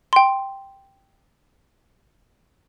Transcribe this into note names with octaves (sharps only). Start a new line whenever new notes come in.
G5 C6